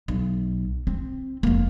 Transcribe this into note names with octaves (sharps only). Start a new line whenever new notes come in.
B1
C4
F1 A#3